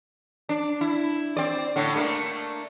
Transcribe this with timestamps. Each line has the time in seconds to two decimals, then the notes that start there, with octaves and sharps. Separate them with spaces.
0.49 D4
0.81 E4
1.37 C4 D5
1.76 A2 D3
1.96 A3 A#3 D4